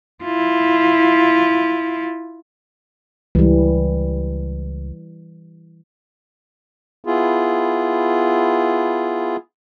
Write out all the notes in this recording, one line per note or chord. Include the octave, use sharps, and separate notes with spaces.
E4 F4
C#2 E3 G3
B3 E4 F4 G#4